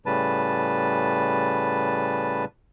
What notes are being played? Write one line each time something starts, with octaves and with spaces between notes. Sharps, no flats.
A2 C#3 G3 B4 A5